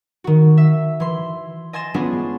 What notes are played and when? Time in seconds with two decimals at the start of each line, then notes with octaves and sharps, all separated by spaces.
0.24 D#3 F#4
0.57 E5
1.00 E3 C6
1.73 D#5 G#5 C6 A6 E7
1.94 G#3 B3 C#4 D4 F4 G#4